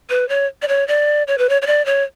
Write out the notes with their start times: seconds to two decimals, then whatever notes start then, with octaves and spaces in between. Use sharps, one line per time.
0.10 B4
0.29 C#5
0.62 D5
0.68 C#5
0.88 D5
1.27 C#5
1.38 B4
1.49 C#5
1.62 C#5
1.67 D5
1.86 C#5